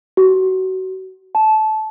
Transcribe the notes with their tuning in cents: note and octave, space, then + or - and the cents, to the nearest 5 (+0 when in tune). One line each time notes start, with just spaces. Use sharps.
F#4 +25
A5 -20